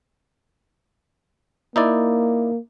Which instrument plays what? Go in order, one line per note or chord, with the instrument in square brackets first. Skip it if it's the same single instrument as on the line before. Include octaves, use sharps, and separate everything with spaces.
[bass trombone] A#3 [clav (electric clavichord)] D#4 E4 D5